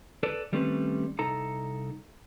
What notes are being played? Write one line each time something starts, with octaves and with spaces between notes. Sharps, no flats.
A4 B4 D5
D#3 G3 A3 C4 C#4 B4
C2 D#4 A4 A#5